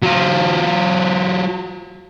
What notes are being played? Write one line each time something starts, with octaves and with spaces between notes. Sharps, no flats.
F#3 F4